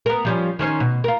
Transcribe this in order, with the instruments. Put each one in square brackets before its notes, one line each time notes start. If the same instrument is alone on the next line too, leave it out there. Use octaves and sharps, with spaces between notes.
[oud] B3 A#4
F3 G3 C#4
D#3 C#4 C5
B2
F4 A#4